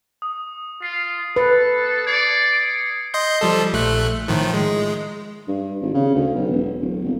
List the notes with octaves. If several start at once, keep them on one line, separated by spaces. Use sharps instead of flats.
D#6
F4 C7
A4 B4
D5 G#6 C7 C#7
D#5 C6 G6
F3 G3 A4
A#1 A3 F#6
A2 D#3 F3
G#3
G2
G#1
C#3
D2
B1
E1
D1
G1